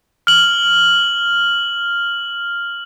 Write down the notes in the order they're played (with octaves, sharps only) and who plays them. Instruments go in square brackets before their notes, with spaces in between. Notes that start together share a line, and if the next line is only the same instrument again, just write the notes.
[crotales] F6 F#7